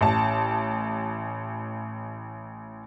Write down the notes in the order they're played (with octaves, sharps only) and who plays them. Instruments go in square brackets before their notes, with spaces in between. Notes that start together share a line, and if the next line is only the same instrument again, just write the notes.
[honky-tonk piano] A1 A5